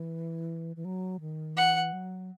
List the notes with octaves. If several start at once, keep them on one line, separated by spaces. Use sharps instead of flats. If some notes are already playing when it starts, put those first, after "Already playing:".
Already playing: E3
E3
F#3
D#3
E3 F#5
F#3